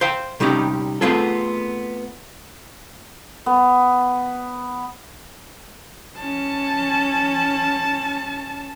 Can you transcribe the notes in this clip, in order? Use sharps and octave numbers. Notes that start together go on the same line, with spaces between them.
C5 F5 G5
C3 G3 C#4 D#4 G4
A3 B3 C4 F4 G#4 A4
B3
C#4 A5